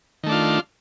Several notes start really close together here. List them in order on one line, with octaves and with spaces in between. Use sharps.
D#3 A3 D4 F4